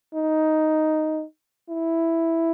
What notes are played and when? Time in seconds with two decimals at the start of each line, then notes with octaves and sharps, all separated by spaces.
0.15 D#4
1.70 E4